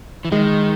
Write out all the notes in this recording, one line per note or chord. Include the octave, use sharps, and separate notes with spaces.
E3
D#3 G#3